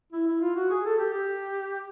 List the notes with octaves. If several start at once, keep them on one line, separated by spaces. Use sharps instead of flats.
E4
E4
F4
F#4
G#4
A4
G4
G4